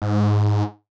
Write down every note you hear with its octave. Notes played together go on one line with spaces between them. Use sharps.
G#2